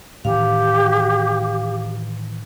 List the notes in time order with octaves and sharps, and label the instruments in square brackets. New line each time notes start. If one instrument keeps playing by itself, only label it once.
[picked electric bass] A2 D#3 E3 [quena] G4 [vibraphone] F5